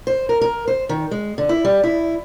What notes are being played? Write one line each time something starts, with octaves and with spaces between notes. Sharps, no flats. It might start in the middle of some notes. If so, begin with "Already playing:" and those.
C5
A#4
A#4
C5
D#3
G#3
D3
E4
G3
E4